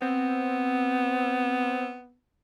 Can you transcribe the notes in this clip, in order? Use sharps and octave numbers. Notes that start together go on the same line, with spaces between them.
B3 C4